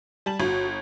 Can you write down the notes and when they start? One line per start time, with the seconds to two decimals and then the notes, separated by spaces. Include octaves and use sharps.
0.26 G3 A5 F#7
0.40 G1 F#4